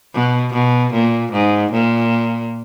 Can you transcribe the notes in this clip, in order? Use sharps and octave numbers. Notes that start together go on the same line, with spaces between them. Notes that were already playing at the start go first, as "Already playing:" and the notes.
B2
B2
A#2
G#2
A#2